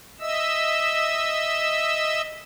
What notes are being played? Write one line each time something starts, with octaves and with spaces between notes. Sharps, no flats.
D#5 E5 E6